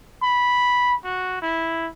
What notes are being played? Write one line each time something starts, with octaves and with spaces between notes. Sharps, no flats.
B5
F#4
E4